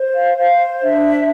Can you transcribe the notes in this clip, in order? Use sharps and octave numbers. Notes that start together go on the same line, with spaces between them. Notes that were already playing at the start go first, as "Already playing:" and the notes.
Already playing: C5
F5
C5 F5
D4 E5